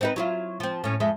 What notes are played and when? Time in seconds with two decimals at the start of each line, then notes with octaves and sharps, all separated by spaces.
0.01 C4 D#4 B4
0.16 F#3 E4 F4
0.60 F3 C4
0.84 A2 C#4
1.00 F2 G#3 E5